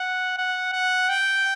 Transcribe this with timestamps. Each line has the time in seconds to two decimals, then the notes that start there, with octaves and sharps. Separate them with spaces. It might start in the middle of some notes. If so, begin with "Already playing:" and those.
Already playing: F#5
0.38 F#5
0.73 F#5
1.09 G5